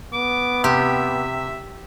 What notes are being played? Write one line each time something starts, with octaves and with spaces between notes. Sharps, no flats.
B3 D6
C3 G4 E5